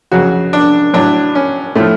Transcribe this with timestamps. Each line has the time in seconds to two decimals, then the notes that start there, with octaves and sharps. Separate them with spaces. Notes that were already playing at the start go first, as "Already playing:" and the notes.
0.12 F2 C#3 F#3 F#4
0.53 D4
0.94 A2 F#3 D4
1.35 C#4
1.75 A2 F3 A3